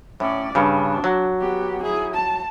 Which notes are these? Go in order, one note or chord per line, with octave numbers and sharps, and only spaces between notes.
A2 C#4 D5
G2 C#3 D4
F#3
B3 G4
E4 G#4
A5